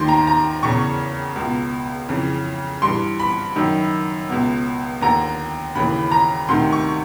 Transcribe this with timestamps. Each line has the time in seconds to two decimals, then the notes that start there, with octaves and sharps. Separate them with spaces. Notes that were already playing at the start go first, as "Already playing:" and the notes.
Already playing: D#2 D#3 C6
0.08 A#5
0.27 A#5
0.63 E2 C#3 E3 C#6
1.36 C#2 B2
2.09 F2 C#3 E3
2.82 G2 E3 C6
3.20 B5
3.56 F#2 D#3
4.29 C#2 B2
5.01 D#2 D3 A#5
5.75 D#2 C#3 E3 B5
6.11 A#5
6.48 D2 C3 D#3 C6
6.73 C#6